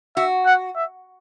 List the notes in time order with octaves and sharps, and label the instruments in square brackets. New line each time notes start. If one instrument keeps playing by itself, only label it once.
[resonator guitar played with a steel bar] F#4 [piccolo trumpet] E5
[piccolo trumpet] F#5
E5